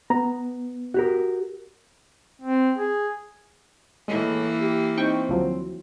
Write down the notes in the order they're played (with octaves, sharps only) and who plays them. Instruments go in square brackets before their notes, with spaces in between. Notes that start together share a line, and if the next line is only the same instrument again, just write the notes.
[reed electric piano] B3 [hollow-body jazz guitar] A#5
[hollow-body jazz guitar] F#4 G4 A#4
[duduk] C4
G#4
[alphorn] A2 [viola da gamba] E3 A#3 [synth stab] G#3
[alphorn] G4
[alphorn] C4 [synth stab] D#4 G5 C#6
[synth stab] D2 F3 F#3